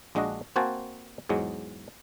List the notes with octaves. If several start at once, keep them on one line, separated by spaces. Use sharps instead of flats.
A#1 G#3 D4 F#4 D#5
A#3 C4 F#4 C5 G#5 A5
E2 G#2 F#3 G#3